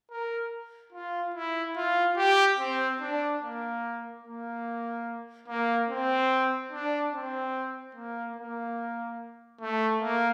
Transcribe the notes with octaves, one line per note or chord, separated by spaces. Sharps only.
A#4
F4
E4
F4
G4
C4
D4
A#3
A#3
A#3
C4
D4
C4
A#3
A#3
A3
A#3